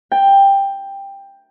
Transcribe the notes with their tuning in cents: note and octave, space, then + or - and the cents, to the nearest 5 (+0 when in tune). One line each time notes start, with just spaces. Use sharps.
G5 +10